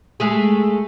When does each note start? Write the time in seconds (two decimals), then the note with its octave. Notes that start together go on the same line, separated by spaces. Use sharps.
0.20 G#3 A3 G#4